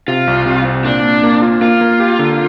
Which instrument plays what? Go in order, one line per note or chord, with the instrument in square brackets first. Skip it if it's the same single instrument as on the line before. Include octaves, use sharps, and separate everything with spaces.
[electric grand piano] C3 [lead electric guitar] F4
[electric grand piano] C2
C3
C4
[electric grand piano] A#2 [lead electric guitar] D4
[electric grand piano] A#3
A#3
F4
[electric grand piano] A#3 [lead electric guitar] F4
[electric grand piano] A#3
G4
D3